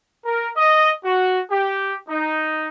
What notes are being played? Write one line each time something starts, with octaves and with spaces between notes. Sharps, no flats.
A#4
D#5
F#4
G4
D#4